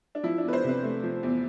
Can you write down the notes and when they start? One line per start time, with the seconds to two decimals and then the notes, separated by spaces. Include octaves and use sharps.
0.15 D4
0.23 F3 E4
0.38 D4
0.44 E2 B4
0.53 C5
0.64 C3
0.69 B4
0.83 A3
1.03 F3
1.23 E2